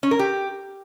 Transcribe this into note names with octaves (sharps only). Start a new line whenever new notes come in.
C#4
A#4
G4